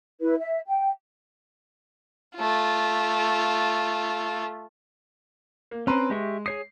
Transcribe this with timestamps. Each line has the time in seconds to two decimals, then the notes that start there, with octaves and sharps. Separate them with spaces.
0.21 E4 B4
0.39 E5
0.67 G5
2.36 A3 F4
5.71 A#3
5.87 C4 C#4 B4 A#5 C6
6.10 G#3 G4 E5 C#6
6.46 G#4 C#5 D#6 C7